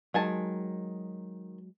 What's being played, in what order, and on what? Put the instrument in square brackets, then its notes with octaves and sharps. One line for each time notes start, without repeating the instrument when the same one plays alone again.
[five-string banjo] D#3 G#5 A5 [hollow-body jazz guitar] F#3 G#3